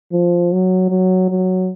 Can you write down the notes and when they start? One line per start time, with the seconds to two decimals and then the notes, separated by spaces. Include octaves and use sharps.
0.12 F3
0.52 F#3
0.90 F#3
1.30 F#3